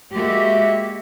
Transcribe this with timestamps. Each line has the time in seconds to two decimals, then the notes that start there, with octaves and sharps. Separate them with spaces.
0.13 G#3 A#3 F#4 G4 E5